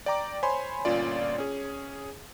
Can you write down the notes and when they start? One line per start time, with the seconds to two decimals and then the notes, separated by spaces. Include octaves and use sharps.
0.06 D5 G5 A#5 D6
0.43 C5 C#5 G#5 B5 C6
0.85 G1 A#2 C#4 F4 D5
1.38 C#4 G#4